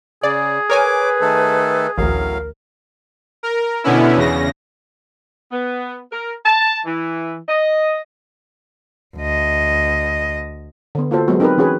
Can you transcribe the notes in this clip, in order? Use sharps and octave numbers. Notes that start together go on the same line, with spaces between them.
C#3 G#4 D5
A#4 B4 C#5 G#5 D6
D#3 A3 A4
A1 D2 A2 F#3 A#4 F5
A#4
B2 D3 B3 C#4 E4
E2 C#3 A#6
B3
A#4
A5
E3
D#5
D2 D#5
D3 B3
A#3 F4 F#4 A4 C5
F#3 G#3 A#3 B3 F#4
C4 D#4 G4 A#4 B4
E3 C#4 F#4 G#4 B4